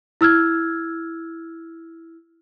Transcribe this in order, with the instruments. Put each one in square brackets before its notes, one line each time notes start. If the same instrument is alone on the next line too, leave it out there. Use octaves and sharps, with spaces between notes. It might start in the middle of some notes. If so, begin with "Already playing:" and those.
[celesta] E4 E6 F6 G#6